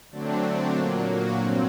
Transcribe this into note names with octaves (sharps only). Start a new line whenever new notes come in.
D3 F#3 A3 C4 D4
A#2 F#3 A#3 D4
F#4
G2 F#3 C4